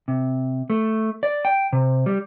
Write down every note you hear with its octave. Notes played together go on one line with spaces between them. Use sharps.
C3
A3
D5
G5
C3
G3